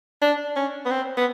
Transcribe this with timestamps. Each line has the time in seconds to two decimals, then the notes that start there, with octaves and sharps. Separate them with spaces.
0.22 D4
0.56 C#4
0.86 B3
0.91 C4
1.17 B3